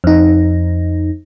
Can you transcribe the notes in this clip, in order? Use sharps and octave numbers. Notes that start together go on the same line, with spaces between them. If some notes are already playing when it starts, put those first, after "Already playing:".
F2 D#4